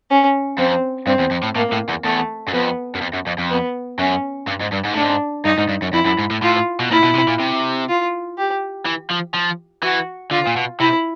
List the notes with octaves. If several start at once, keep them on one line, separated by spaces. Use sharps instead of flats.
C#4
F2 C4
G2 C4
E2
F2
A2
A2 A#3
A2
E2
E2 A3
F#2
F2 B3
F#2
F2
F#2
F2
F2
B3
F#2 C#4
G2
G#2
G2
G#2
A2
G#2 D4
G2 D#4
G#2
G2
F#2
F2 E4
F#2
G#2
A2
A2 F4
B2
A#2 E4
B2
C3
A#2
C3
F4
G4
E3
F3
F3
E3 F#4
D3 F4
A#2
B2
C3 E4